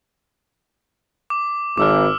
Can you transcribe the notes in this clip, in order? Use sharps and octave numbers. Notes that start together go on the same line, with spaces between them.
D6
G#1 D6 E6 F6